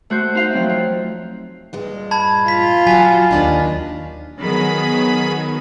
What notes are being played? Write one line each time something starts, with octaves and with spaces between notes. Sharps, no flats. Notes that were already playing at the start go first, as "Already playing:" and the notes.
A3 F#4 C5 G6
D#4 C5 E5 F5
F3 F#3 C4
F4
G2 A#2 G#3
A5 B5 G#6
F4 B6
F#3 F#4 G#5 B6
D#2 D4 D#4
D#3 F#3 B3 G#4 B5